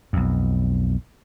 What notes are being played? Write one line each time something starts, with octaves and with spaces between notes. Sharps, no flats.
B1 F2